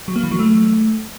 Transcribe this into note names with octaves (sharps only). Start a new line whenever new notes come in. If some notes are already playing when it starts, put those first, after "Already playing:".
F#3
A#3
E3
F#3
A3